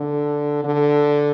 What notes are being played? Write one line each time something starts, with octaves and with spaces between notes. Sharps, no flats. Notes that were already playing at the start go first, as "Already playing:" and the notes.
Already playing: D3
D3